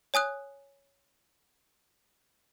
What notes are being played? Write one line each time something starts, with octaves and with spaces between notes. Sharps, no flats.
C#5 G#5 D#6 F#6